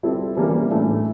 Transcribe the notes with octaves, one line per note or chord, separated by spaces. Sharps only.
G3 C4 E4 A4
E3 G3 A#3 C#4
A2 E3 A3 D4